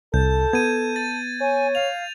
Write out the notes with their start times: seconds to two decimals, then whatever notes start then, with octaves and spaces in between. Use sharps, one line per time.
0.14 C2 A4 A5 G6
0.53 B3 G#6 D#7
0.96 A6
1.41 C#5 G#5
1.75 F5 F7